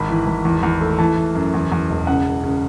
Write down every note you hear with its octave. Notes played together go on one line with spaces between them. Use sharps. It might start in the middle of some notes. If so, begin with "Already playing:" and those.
Already playing: G#1 B5
E3
G#1
E2
E2
A3
E3 A5
E3
F#2
E2
E2
E1
C#3 F#5
C#3
C#3